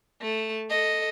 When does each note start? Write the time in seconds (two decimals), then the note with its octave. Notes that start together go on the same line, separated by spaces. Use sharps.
0.21 A3 A5
0.70 A4 D#5